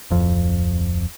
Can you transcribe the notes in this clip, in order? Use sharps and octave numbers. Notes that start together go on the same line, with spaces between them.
D1 F2